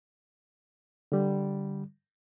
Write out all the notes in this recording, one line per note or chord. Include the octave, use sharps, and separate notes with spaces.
D3 G3